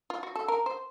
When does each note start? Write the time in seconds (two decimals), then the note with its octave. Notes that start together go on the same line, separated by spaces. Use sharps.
0.10 F4
0.23 F#4
0.36 A4
0.48 A#4
0.66 C5